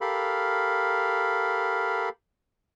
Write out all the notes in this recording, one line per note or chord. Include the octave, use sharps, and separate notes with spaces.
G4 A4 A#4 F5 B5